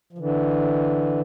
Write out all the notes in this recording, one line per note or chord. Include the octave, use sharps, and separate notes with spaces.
F3
D3 E3